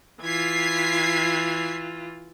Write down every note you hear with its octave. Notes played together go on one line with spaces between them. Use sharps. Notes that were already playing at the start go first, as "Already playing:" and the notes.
E3 F4 G#6 B6 C7